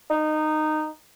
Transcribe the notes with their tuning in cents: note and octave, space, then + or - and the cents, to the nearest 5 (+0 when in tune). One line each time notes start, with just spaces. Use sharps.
D#4 -15